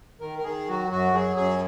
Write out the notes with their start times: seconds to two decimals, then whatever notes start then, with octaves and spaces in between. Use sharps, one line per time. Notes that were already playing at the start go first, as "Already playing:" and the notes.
0.20 D#3 A#4
0.38 A#4
0.44 D#3 G#4
0.68 F#3 F#4
0.91 F#2 F#4
1.14 F#3 G#4
1.36 F#2 G#4